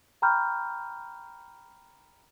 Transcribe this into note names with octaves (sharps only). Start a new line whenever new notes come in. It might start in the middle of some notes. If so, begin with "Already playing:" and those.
G5 A#5 B5 C#6 F6 G6